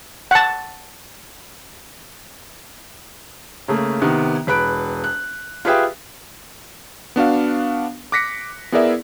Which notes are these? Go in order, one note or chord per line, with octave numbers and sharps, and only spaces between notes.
F#5 A5
C#3 A3 A#3
C3 D#3 B3
E1 B4 B5 F#6 D7
F#6
F4 G4 G#4 B4 E5 G5
B3 D4 F#4 F5
D6 F#6 A#6 B6 C#7
B3 E4 G#4 A#4 D5 E5